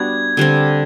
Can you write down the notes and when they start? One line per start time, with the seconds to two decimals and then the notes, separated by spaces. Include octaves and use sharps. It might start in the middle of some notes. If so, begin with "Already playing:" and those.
Already playing: G3 B3 D4 F#4 G#6
0.37 D3 G3 C4